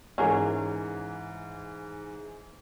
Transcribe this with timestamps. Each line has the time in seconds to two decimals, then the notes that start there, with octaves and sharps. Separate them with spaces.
0.18 G#2 E3 C#4 G#4 A#4